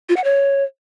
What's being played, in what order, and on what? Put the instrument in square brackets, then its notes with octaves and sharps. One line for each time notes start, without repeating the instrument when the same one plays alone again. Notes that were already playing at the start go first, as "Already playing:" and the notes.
[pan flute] F4
F#5
C#5